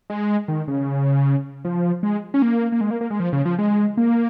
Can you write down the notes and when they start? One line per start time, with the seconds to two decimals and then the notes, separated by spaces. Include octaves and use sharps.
0.10 G#3
0.48 D#3
0.68 C#3
1.65 F3
2.03 G#3
2.34 C#4
2.42 A#3
2.72 A#3
2.81 G#3
2.91 A#3
3.01 A#3
3.11 G#3
3.20 F3
3.33 C#3
3.45 F3
3.58 G#3
3.97 A#3